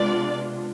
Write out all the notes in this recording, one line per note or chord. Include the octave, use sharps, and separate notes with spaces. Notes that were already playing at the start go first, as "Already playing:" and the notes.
Already playing: C3 G#3 B3 D4 F4 D5